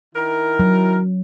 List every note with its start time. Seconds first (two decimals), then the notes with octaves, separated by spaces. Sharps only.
0.15 D#3 E4 A#4
0.59 F#3